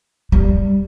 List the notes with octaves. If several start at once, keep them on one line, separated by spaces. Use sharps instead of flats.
G3